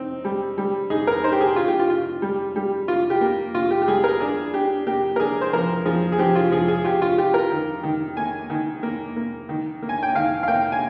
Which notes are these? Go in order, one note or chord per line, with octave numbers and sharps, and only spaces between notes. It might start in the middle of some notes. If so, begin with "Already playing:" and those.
Already playing: C4 D#4
G3
G3
D#4 G#4
A#4
D#4 C5
G4
G#4
F4
G4
F4
F4
G3
G3
F4
G4
A#3
F4
G4
G4
G3 G#4
A#4
D4 G#4
D4 G4
A#3 G4
A#4
D4 G#4
C5
F3 A#4
F3 G#4
G#4
F3 G4
F4
F3 G#4
G#4
F4 G4
F4
F4 G4
A#4
D#3
D#3
A#3 G#5
D#3
A#3
A#3
D#3
A#3
G#5
G5
D#3 F5
F5
A#3 G5
G#5